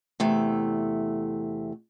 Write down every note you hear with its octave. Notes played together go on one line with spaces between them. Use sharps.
E2 C3 A3